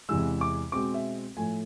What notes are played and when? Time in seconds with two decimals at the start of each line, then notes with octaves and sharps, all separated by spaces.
0.09 E2 C3 E3 G#3 E6
0.41 D6
0.72 B2 G#3 C4 D6
0.94 E5
1.37 A2 F3 A3 G#5